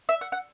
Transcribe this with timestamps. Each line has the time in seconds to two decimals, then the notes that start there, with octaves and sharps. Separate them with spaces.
0.09 E5
0.21 F#5
0.32 F#5